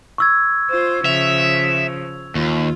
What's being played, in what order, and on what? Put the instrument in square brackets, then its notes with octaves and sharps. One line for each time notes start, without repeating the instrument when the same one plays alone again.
[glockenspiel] C#6 E6 G#6
[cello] F4 C5
[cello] C#3 F3 [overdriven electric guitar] E5 [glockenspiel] F7
[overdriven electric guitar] D#2 [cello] F4